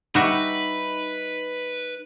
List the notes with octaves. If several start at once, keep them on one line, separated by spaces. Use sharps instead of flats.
G3 D#4 F#4 B4 E5